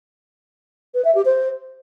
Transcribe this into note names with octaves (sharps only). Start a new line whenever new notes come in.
B4
E5
G4
C5